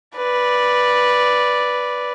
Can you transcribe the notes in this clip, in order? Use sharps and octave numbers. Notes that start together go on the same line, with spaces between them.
B4 D5